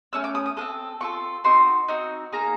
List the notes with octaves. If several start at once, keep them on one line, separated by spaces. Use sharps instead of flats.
A3 C#4 E6
D6
D#6
D#6
C4 F4 A4 D#6
C4 F4 A4 C#6
C4 D#4 F#4 C6
C4 D#4 F#4
A#3 D#4 G#4 A#5